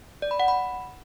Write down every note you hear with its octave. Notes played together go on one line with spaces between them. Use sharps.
D5
B5
F#5
B5